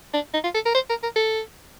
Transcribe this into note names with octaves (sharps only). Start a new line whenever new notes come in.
D4
D#4
F4
A4
A#4
C5
A#4
A#4
A4